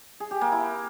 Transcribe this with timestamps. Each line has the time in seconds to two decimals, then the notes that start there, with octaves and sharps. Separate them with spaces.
0.20 G#4
0.31 G4
0.41 A#3
0.52 E4